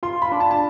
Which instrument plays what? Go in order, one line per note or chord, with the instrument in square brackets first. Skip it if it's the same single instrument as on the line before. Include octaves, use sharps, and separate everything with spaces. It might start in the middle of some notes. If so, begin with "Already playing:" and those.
[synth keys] F4 [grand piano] C6
[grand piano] B5
[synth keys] D4
[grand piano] A5
A5